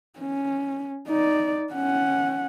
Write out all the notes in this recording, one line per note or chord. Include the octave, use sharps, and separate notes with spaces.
C#4
D#4 D5
C#4 F#5